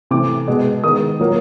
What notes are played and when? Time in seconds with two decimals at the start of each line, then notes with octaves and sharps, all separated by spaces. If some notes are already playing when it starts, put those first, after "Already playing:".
0.11 C3 E3 A3 D6
0.48 B2 G#3 B3
0.84 D#3 G#3 B3 D#6
1.19 A#2 F#3 A#3